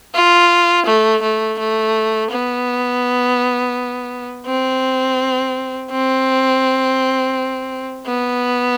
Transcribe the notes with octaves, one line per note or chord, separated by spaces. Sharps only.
F4
A3
A3
A3
B3
C4
C4
B3